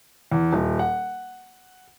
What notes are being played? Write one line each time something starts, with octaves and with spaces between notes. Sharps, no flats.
E2
D#1
F#5